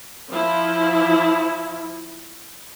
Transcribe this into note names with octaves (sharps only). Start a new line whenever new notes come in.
F3 E4